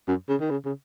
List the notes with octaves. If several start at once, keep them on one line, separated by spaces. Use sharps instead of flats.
F#2
C#3
D#3
C#3
C#3